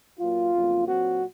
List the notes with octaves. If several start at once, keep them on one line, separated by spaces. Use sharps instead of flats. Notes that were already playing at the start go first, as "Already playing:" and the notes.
A#2 F#3 A#3 F4
F2 C#3 F#3 A#3
A#2 F#3 C4 F#4